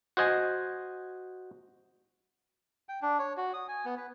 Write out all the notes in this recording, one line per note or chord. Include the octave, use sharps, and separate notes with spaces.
F#4 C5 D#5 G#5
G5
D4
C#5
F#4
D#6
G#5
B3
B4